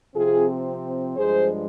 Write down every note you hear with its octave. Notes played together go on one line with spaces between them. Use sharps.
C3 F3 C4 F4 G#4
G2 F3 G#3 G#4 C5